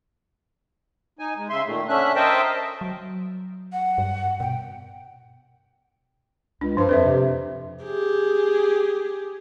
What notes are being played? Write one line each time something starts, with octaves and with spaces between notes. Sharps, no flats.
D#4 G#5
G#3
C#3 E5 C6
A#2 D#3 A3
D3 C#4 D4 E5 F#6
A#4 C5 D#5 E5 G5 A5
F#3
F#5
G2
B2 G5
C#2 D4
G2 F3 C5
F2 B4 C5 E5
C3
G4 G#4